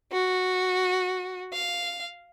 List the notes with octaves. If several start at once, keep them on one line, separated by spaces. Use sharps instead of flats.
F#4
F5